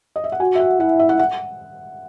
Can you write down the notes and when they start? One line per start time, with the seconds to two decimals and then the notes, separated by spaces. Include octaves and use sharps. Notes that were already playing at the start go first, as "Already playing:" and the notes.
0.16 D#5
0.24 E5
0.32 F#5
0.40 F#4 G#5
0.55 E5
0.60 F#5
0.80 E4 F#5
0.99 E5
1.09 F#5
1.19 F#5